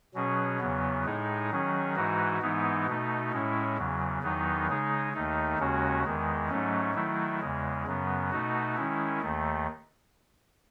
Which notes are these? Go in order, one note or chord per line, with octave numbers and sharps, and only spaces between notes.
B2 F#3 C#4 G#4
E2 C#3 F#3 B3
A2 G#3 D#4 G#4
D#3 F#3 C#4 G#4
G#2 E3 G#3 D#4 F#4
G#2 E3 G#3 B3 D#4
B2 A3 D#4
A2 G#3 C#4 E4
E2 C#3 F#3
E2 D#3 F#3 B3 D#4
C#3 G#3 D#4 G#4
D#2 D#3 A3 D#4
D#2 C#3 G#3 C#4 F#4
E2 D#3 G#3
G#2 F#3 A3 C#4
D#3 F#3 A3 E4
E2 C#3 G#3
F#2 C#3 F#3 B3
B2 A3 D#4 F#4
D#3 G#3 C#4 E4
D#2 D#3 A3